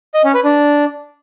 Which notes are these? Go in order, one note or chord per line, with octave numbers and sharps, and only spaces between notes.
D#5
C#4
B4
D4